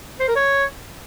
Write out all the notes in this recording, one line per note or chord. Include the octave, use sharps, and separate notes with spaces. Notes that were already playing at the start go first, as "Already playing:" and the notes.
C5
A#4
C#5